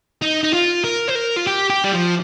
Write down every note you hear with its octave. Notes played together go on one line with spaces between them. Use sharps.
D#4
D#4
F4
A#4
C5
A#4
F4
G4
G4
G3
F3